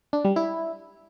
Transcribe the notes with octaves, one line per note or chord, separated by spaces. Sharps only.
D4
G3
E4